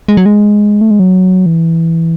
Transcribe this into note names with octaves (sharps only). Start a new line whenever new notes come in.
G#3
F#3
G#3
A3
G#3
F#3
E3